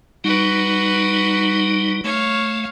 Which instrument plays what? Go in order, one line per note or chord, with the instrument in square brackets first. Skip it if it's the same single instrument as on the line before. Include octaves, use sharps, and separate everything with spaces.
[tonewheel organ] G3 D#4 [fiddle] F#4 B4
[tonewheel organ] A3 [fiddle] C#5 F5